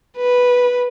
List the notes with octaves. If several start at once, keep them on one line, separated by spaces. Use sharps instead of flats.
B4